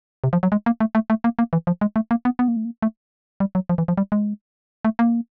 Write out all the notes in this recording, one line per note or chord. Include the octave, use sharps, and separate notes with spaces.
C3
F3
F#3
G#3
A#3
A3
A3
A3
A#3
A#3
E3
F3
G#3
A3
A#3
B3
B3
A#3
A3
A#3
A3
G3
F#3
F3
E3
F3
G3
G#3
A3
A#3